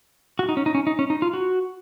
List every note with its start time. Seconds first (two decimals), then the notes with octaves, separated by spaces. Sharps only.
0.39 F#4
0.49 D#4
0.57 C#4
0.66 D#4
0.75 C#4
0.87 D#4
0.99 C#4
1.10 D#4
1.22 F4
1.34 F#4